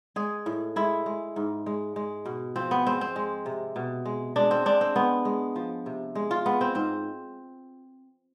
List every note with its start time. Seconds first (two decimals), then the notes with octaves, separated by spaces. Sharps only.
0.16 G#3 G#4
0.46 A2
0.76 G#3 E4
1.06 G#3
1.36 G#2
1.66 G#3
1.96 G#3
2.26 B2
2.56 F3 C4
2.71 B3
2.86 G#3 C4
3.01 C4
3.16 G#3
3.46 C3
3.76 B2
4.05 G#3
4.36 G#3 D4
4.51 C4
4.65 G#3 D4
4.81 C4
4.96 G#3 B3
5.25 G#3
5.56 F3
5.86 C3
6.15 G#3
6.31 F4
6.46 G#3 B3
6.61 C4
6.75 G#2 C4